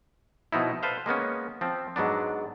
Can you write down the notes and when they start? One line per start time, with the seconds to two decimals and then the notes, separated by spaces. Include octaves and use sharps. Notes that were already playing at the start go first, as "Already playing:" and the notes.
0.52 B2 F3 D#4 E4
0.83 A4 B4 C5 F5
1.06 G#3 A#3 B3 C#4
1.61 F3 C4
1.96 G#2 F#3 B3 D4